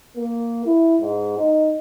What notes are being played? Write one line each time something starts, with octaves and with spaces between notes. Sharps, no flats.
A#3
E4
G#2
D#4